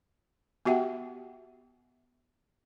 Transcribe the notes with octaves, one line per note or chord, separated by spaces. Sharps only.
B3 F#4 G4 E5 F#5 G5